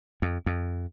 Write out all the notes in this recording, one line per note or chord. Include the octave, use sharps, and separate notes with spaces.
F2
F2